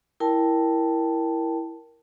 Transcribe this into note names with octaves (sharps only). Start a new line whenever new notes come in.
E4 A#4 G5 A5